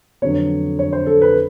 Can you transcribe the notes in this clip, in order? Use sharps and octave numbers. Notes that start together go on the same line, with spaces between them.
F2 D3 F#3 B3 C#5
C#5
C5
A4
B4